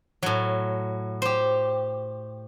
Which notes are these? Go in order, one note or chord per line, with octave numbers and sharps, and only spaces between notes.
A2 F#3
G4 C5